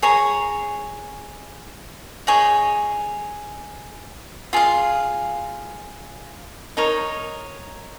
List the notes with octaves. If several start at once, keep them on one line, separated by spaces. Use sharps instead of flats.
G#4 C#5 A#5
D#4 G#4 C#5
F4 G#4 F5
D#4 A#4 C#5